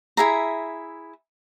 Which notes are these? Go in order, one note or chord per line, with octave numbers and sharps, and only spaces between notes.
E4 G#4 E5 A#5